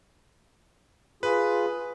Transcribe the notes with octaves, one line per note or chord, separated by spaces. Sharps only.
F4 G#4 B4